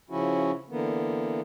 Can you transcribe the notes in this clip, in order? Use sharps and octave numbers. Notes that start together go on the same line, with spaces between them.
C#3 F3 C#4 E4 F#4
D3 E3 A#3 B3